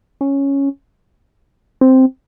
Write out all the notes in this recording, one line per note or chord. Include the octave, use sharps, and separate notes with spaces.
C#4
C4